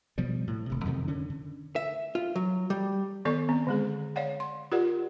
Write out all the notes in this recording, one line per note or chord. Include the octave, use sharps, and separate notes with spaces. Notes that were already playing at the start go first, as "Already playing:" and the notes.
B2 F3 G3
A2
D#1 C3
F2 C3 D#3
D3 C#4
D3
E5
F4
F#3
G3
D#3 B3 A4 D5 C#6
B3 C4
D3 G#3 G#4
C#5 D5 F5 F#5
C6
F4 G4 A#4 D5 F#5